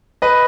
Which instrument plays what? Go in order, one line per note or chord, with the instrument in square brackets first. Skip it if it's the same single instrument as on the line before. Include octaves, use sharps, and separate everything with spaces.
[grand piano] B4 D#5